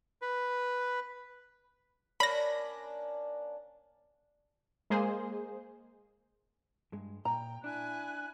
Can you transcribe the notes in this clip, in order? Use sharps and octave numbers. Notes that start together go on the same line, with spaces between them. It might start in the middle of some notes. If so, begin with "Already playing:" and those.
B4
A#3 C#4 D4 B5 A#6
G#3 A#3 G#4 C5
G2 G#3
A#2 G5 A#5
D4 E4 G#5 F#6